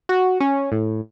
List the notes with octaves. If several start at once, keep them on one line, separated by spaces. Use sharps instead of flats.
F#4
C#4
A2